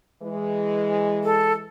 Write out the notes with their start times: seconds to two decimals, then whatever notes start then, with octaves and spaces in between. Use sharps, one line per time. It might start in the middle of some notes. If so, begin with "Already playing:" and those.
0.23 E3 G#3
1.24 A4